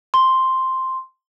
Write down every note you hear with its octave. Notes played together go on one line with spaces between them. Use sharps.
C6